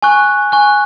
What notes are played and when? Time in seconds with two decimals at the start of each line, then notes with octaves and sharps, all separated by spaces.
0.02 G#5 C#6 F#6
0.52 G#5 C#6 F#6